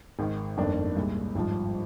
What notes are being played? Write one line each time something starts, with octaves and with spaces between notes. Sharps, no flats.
G#1 G#2 D#3
G1 F2 D#3 A#3 D4
C2 A#2 G#3
G#1 G2 F3